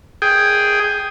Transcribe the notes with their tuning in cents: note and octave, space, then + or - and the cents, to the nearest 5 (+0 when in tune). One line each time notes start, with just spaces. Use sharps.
G#4 +0 G5 +5